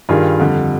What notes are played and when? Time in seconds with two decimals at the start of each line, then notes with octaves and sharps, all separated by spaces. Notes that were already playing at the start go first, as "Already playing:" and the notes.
0.09 G2 D#3 G3 F4 G#4
0.39 F2 D3 G3